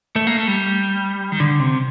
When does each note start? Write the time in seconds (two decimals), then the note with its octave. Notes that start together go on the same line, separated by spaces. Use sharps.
0.16 A3
0.27 A#3
0.37 A3
0.48 G3
1.32 D#3
1.40 D3
1.59 C3